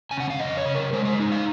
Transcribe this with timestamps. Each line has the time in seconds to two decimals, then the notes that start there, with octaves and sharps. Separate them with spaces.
0.11 C#3 G#5
0.20 F#5
0.30 F5
0.38 F2 D#5
0.57 C#5
0.65 C#3
0.75 A#4
0.93 G#3 C5
1.05 C5
1.20 D#4
1.32 F5